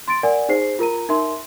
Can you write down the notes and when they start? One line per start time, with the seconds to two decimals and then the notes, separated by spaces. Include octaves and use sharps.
0.08 C6 A6 D7
0.23 A#4 D5 F#5 G#5
0.49 D#4 G#4 C5 C7
0.79 F4 A#4 A#5 D#7
1.09 D#4 A#4 E5 C6